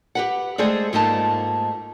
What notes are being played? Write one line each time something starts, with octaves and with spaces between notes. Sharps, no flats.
G4 B4 F#5
G#3 A3 C4 G#4 C5 D5
G#2 A3 A#3 D#4 F4 A5